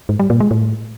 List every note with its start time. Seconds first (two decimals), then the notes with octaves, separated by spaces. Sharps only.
0.09 G#2
0.19 G3
0.30 A#2
0.40 G#3
0.51 A2